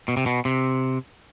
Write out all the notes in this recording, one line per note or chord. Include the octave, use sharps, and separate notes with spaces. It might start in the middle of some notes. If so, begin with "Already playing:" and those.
B2
C3
B2
C3